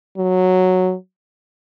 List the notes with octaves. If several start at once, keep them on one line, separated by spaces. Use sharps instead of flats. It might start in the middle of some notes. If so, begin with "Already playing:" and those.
F#3